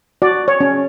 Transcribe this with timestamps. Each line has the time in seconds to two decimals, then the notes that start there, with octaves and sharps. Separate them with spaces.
0.22 F#4 D5
0.48 C#5
0.61 C#4